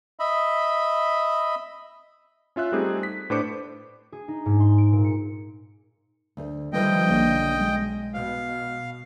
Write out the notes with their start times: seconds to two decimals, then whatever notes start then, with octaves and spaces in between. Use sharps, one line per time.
0.19 D#5 E5 B5
2.56 C#4 F4 E5 F#6
2.72 G3 A3 C4 D#4 G4 G#4
3.03 B6
3.30 A2 D4 B4 C5 D6 C#7
4.12 G#4
4.28 D#4
4.46 G#2
4.60 C6
4.78 D7
4.92 A#2
5.04 C#7
6.37 D2 C5
6.73 D#3 F3 G3 A3 B4 D#5 F5 G5
7.08 B1 D3 A#3 C#4
7.60 G#3
8.14 B2 F5